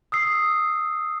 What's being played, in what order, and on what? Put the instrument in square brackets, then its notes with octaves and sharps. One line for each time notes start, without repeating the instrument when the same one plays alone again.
[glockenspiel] D#6 E6 C7